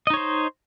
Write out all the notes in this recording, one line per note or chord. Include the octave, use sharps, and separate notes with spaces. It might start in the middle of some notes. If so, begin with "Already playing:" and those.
D#4 C5 C#5 D#5